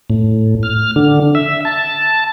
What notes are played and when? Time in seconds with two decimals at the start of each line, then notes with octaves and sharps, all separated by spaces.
0.10 A2
0.63 F6
0.96 D3
1.35 E5
1.65 A5